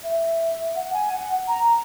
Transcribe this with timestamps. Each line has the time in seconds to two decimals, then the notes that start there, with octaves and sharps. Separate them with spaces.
0.04 E5
0.75 F#5
0.93 G#5
1.12 F#5
1.48 A#5